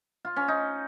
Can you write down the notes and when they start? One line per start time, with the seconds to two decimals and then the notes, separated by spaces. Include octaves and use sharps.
0.25 F4
0.36 C#4
0.48 D#4